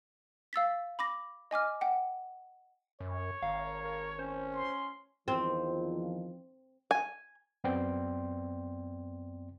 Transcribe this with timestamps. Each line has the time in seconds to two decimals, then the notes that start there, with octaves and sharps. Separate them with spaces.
0.53 F5 E6 A6 B6
0.99 B5 D6 A#6
1.51 D#5 G#5 D6 F6
1.81 F#5 G5
3.00 F#2 C#5
3.42 G#1 F5 A#5
3.83 A#4
4.19 C#4 C5
4.53 C6
5.28 E2 D#3 F3 C4
6.91 G#5
7.64 F#2 B3 C4 D5 G5 C6